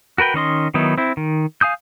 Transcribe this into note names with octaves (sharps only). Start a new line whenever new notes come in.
F#4 A#4 B4 G5
D#3 C#4 D#5 C6
D#3 F#3 B3 D#4 E4
C4 E4
D#3
F5 G#5 D#6 G6